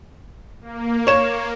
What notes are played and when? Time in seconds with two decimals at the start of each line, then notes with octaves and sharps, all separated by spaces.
0.61 A#3
1.07 C#5 E7